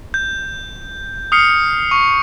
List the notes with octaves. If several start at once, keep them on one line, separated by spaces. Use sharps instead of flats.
G6
D#6 F6 C7 C#7
C#6